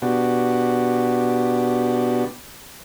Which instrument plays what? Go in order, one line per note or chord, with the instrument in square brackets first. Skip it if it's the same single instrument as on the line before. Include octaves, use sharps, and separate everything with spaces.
[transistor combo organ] B2 B3 D4 F#4 G4